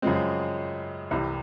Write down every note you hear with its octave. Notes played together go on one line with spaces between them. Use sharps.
F#2 C#3 F3 G#3 C4
C2 C3 E3